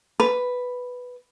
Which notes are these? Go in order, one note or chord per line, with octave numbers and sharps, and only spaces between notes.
B4